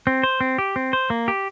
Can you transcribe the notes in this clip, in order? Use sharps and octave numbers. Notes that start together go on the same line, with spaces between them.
C4
C5
C4
G4
C4
C5
A#3
G4